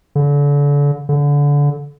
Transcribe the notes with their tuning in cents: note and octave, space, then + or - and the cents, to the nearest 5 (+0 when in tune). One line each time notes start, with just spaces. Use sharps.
D3 -35
D3 -25